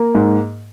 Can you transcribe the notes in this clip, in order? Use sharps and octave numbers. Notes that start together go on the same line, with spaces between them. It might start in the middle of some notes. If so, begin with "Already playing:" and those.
Already playing: A#3
G#2